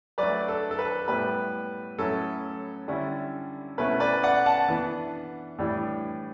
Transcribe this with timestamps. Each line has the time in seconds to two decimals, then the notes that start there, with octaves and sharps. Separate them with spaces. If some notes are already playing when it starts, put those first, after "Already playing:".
0.18 F#3 A3 D4 B4 D5
0.48 A4
0.71 A4
0.79 B4
1.08 A2 G3 B3 E4 B4
1.98 A2 F#3 C#4 E4 A4
2.88 D3 G3 C#4 E4
3.78 B2 A3 C#4 E4 B4
4.00 B4 D5
4.23 D5 F#5
4.46 F#5 A5
4.69 E3 B3 D4
5.59 A2 E3 G3 D4